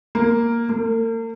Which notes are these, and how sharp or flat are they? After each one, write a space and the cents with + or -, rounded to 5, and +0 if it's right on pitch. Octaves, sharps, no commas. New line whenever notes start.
A#3 +0
A#3 -40